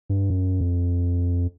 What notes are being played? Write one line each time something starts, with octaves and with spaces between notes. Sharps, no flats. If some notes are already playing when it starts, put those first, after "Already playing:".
G2
F#2
F2